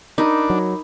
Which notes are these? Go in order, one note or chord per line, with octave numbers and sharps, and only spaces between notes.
D4 D#4 A#4 B5 D6
F#3